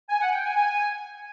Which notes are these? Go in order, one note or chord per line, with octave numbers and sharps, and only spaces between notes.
G#5
F#5
G5
G#5
G#5